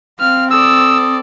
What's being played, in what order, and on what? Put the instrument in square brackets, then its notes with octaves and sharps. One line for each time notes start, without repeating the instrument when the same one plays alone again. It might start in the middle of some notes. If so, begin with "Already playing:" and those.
[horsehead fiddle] C4 [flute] F5 [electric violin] F6
[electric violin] A4 D5 [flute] D#6 [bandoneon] E6